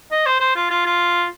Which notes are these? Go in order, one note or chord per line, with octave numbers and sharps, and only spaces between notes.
D#5
C5
C5
F4
F4
F4